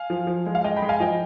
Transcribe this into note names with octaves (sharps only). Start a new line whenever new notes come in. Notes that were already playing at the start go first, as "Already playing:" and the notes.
Already playing: F5 G#5
F3
F3
G#3
F5
G#3 D#5 G5
G5 B5
G#3
F5 G#5
F3 D#5 G5